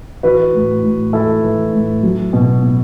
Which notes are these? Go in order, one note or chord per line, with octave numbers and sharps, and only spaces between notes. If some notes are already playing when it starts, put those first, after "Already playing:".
E3 F#4 B4
A2
A2
E3 E4 A4
E3
A2
F#3
B2
B2